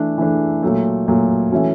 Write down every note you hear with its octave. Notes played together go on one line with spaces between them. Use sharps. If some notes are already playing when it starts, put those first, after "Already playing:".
Already playing: E3 A3 D4
E3 A3 D4
A#2 F#3 A3
A#2 F#3 A3
E3 A3 C#4 F#4